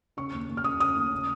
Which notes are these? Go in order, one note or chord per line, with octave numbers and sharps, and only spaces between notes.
C#3 C#6
D#2
D#2
F6
C#3 D#6
C#3 D#6
D#2
C#3